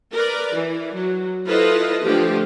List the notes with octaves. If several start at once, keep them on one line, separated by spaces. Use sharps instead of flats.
A#4 B4 D5
E3
F#3
E4 F4 A4 B4 C5 D#5
D3 F3 A3 G4